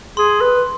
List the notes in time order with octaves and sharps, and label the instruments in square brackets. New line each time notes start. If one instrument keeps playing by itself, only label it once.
[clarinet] G#4 [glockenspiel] C6
[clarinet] B4